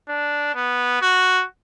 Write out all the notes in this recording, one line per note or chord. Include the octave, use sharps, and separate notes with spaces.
D4
B3
F#4